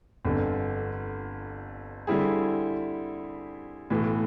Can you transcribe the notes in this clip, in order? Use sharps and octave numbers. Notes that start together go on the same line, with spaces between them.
G1 F2 D3
D3 G3 C4 E4 G#4
B1 A2 E3